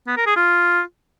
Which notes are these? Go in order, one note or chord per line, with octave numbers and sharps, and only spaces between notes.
B3
A#4
G#4
F4